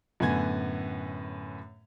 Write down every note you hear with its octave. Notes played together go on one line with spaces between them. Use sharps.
F#2 A2 D3 B3 G#5 G#6